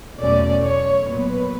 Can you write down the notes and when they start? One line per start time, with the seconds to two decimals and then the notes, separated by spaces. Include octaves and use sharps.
0.20 E2 B2 F#3 A3 C#4 D5
0.64 C#5
1.06 A#2 F#3 B3 B4